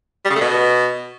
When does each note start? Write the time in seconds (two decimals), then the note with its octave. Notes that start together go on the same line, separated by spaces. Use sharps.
0.25 G3
0.30 C#3
0.36 A3
0.41 B2